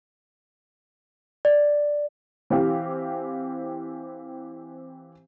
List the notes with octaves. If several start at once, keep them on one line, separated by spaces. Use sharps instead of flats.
D5
E3 C4 G4 F5